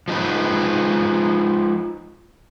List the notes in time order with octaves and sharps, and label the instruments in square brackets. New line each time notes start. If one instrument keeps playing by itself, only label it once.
[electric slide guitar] F3 G#3 D#4 B4